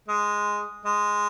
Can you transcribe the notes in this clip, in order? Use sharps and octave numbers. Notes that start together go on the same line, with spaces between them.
G#3
G#3